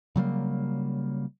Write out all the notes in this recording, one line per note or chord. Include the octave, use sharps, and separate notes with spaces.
C#3 F#3 G3 A#3